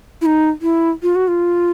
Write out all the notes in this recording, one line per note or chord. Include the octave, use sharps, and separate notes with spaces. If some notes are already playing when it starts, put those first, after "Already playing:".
E4
D#4
E4
F4
F#4
F4